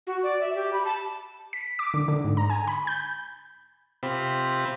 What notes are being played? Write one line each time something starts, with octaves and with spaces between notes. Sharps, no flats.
F#4
D5
E5
G4
B5
A5
B6
D6
D3
D3
G#2
A#5
G#5
B5
G6
C3 C4 F4 G4 B5